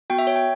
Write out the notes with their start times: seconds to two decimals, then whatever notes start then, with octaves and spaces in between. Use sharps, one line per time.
0.10 B3 F#4 G5
0.18 E5
0.27 C#5
0.36 G5